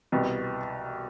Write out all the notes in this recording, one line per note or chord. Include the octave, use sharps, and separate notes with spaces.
C2 B2 G3 B3